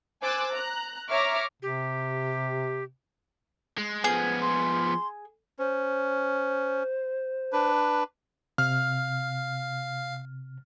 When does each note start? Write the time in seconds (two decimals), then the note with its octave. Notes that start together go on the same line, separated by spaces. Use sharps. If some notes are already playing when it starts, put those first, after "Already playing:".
0.21 C5 G#5 D6 E6 F#6 A6
0.52 A#5 F#6
1.09 C#5 E5 A#5 C#6 D6 F6
1.62 C3 G4
3.78 G#3
4.04 F3 B3 G#4
4.42 C6
5.59 C#4 C5
7.53 D4 B4
8.58 C3 F5 F6